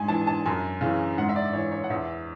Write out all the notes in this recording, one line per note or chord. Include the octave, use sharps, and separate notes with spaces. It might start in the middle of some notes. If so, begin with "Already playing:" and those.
Already playing: G#2 G#5
E3 A5
A5
F#2 G#5
C#3 E3
G#2 F#5
E5
D5
E3 C#5
C#5
F#5
E2 E5